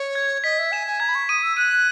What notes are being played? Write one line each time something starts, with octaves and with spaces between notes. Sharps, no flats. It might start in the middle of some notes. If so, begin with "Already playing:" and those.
Already playing: C#5
G#6
D#5 B6
E5
G#5 E7
G#5
A#5 G#6
B5
C#6
D#6 D#7
E6
F#6 D#7